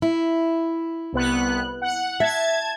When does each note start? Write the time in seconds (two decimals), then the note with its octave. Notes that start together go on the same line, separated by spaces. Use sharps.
0.02 E4
1.13 C2 B3 F#6
1.82 F#5
2.20 E5 A5 G#6